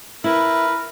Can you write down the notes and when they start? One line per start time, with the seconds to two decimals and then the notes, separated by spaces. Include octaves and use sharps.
0.24 E4 A#4 B4